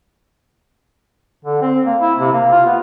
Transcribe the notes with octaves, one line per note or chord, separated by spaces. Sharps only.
D3
C4
A#3
E4
C3
A#3
F4
B3